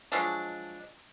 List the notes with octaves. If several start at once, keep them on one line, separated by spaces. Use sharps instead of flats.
F3 F#3 G#3 D4